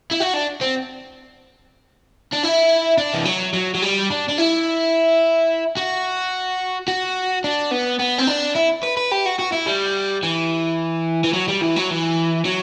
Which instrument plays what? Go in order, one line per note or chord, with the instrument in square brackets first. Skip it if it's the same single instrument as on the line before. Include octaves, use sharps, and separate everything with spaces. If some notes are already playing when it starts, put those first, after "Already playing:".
[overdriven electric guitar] E4
F#4
D4
C4
D4
E4
D4
E3
F#3
F#3
F#3
G3
D4
D4
E4
F#4
F#4
D4
B3
B3
C4
D4
E4
B4
B4
G4
F#4
F#4
E4
G3
E3
E3
F#3
G3
E3
F#3
E3
F#3